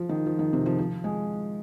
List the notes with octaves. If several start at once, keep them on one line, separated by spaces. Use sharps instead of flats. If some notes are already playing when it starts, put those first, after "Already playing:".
Already playing: F3
D#3
F3
D#3
C3
F3
F3
G#3